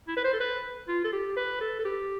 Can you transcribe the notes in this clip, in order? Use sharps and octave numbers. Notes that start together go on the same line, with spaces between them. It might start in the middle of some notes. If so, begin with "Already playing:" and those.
E4
B4
C5
A4
B4
F4
A4
G4
B4
A4
A4
G4